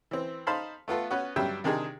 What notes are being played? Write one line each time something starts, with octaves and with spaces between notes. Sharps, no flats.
E3 C4
D#4 C5 F5 A5 B5 C6
A3 B3 F4 A4
B3 C#4 F#4 B4
G2 F#3 G3 E5 G5
C3 D#3 D4 D#4 G4 G#4